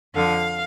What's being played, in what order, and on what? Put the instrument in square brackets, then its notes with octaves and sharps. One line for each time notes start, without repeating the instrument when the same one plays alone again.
[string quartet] F2 D3 F3 F5